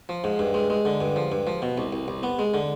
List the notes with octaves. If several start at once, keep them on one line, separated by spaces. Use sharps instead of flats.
F3
G#2
G2
G#3
G#3
D3
G2
F3
G2
F3
B2
C2
C2
C2
B3
G#3
D3